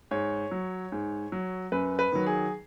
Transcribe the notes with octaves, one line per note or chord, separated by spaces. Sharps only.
G#2 C#5
F#3
G#2
F#3
F#2 B4
B4
D#3 F#3
G#4